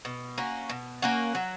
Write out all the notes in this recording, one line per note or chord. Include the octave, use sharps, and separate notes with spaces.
B2
A#3 C#4 F#4
B2
A#3 C#4 F#4
F#3